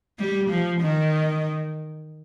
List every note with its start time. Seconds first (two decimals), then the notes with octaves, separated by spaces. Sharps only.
0.19 G3
0.50 F3
0.82 D#3